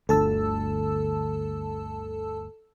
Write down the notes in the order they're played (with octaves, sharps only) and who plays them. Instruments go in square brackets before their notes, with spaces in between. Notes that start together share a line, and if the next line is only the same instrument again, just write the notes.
[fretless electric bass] G1 D2 [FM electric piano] A4 A5 E6